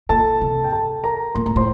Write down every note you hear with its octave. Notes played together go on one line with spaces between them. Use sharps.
A#2 A4 A5
C3
G5
A4 A5
A#4 A#5
A#2 C6
A2 A#5
A2 C5 C6